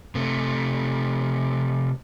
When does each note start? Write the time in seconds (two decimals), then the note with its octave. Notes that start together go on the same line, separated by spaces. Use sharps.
0.15 C3 A3